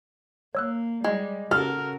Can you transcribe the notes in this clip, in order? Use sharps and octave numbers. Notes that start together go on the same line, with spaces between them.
A#3 C#5 E6 F#6
G3 G#3
C#3 F#4 G4 A4 A#4 F6